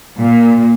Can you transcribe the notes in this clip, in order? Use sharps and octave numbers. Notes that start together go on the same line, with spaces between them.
A#2